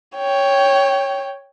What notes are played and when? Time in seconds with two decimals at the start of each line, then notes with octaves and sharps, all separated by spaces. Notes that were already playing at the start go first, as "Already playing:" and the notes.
0.17 C#5 G5